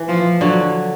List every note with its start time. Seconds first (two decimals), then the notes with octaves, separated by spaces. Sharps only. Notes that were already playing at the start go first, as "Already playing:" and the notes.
Already playing: E3
0.09 F3
0.41 D3 F#3